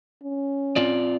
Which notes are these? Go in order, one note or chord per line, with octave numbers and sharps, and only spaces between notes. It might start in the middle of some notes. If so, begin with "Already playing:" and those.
C#4
C4 F4 D5